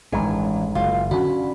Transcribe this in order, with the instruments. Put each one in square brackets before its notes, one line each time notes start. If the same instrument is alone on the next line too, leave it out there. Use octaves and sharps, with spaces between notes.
[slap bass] A1 G2 D#3 [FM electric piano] G#3 [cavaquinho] G#5
[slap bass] F#1 [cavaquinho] F4
[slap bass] D3 C#4 [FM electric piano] F#4 [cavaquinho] B5